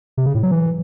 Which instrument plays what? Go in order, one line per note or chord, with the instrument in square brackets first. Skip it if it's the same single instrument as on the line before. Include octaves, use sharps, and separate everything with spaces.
[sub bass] C3
C#3
A2
F#3
E3